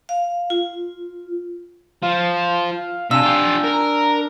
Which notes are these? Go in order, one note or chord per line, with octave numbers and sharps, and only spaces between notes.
F5
F4
F3 F5
C3 D4 G#5 E6
F4 G4
A#4 A#5